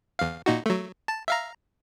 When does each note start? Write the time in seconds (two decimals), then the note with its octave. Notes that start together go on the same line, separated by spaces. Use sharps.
0.19 E2 F5
0.46 A#2 D#4 F#4
0.66 F#3 A3
1.08 A5
1.28 E5 F5 A#5